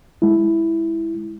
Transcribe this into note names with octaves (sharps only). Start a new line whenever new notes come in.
G#3 E4